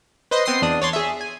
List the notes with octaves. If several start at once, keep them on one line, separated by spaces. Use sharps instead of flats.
B4 C5 D#5 C6
B3 C4 C6 D#6 C7
E2 D4 D#6
C#5 D5 C6
G#4 E5
G#5